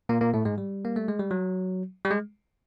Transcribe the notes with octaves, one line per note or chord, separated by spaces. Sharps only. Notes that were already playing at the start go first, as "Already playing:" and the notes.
A#2 A#3
A#2 A#3
A2 A3
G#2 G#3
G3
A#3
A3
G#3
G3
F#3
G3
G#3